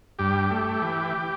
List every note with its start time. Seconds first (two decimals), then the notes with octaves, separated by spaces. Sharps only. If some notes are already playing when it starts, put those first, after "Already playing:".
0.19 G2 G4
0.51 A3
0.82 E3